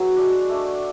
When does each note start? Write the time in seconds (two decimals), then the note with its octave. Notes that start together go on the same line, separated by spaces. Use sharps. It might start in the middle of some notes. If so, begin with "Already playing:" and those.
Already playing: F#3 E4 F#4 G#4 B4
0.16 G#3 D4
0.49 A3 D4